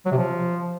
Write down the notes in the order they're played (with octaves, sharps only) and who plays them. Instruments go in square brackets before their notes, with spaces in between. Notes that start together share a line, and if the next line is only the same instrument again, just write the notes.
[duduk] F#3
C3
F3